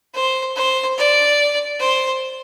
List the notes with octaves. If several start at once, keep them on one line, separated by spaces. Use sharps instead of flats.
C5
C5
D5
C5